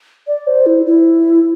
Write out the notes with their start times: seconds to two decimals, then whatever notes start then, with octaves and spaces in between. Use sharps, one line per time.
0.27 D5
0.47 C5
0.66 E4
0.86 E4